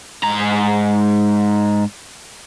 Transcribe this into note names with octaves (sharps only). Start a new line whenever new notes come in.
G#2 A#5